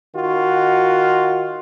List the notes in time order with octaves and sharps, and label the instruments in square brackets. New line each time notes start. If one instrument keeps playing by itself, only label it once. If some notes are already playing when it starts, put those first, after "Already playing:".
[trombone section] D#3 F4 F#4